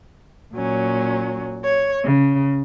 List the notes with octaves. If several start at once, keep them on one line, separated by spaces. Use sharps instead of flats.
A#2 F#3 C#4
C#5
C#3